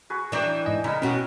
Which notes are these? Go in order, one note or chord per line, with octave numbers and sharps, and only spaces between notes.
F#4 G#4 B4
E3 D4 G5 A#5 D#6
G#2 D#5 G#5
C#3 E4 A#4 D#5 A#5
B2 B3 C#4 F#4 A#4